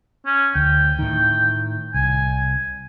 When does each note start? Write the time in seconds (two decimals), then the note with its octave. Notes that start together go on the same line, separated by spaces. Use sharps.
0.26 C#4
0.55 D2 G5
0.99 A2 D#3
1.94 C2 G#5